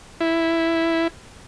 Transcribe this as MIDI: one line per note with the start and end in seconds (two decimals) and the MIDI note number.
0.20 1.08 64